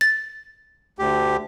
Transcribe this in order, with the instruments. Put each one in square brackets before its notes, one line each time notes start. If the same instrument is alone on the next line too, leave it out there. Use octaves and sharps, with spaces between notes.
[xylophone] A6
[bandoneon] D2 G4